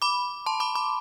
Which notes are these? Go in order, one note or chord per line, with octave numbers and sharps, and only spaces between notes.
B5 D6
A5 C6
B5 D6
B5 D6